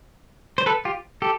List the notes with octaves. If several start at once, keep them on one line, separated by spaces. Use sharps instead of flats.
C5
A4 B4
F4 G4
G4 A4